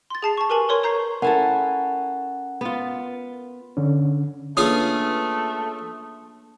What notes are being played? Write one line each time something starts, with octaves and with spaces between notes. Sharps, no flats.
C6 A6
G#4 A5 C7
A5 C#6
G4 A#4 B4 G#5 A5 F#7
A#4 B4 C#5 C6 C#6
C#5 A#5 G6 C7
C#4 E4 A4 A#4 F#5
B3 F4
D3 C#4
A3 A#3 C#4 D4 F4 G#4 B4 D#6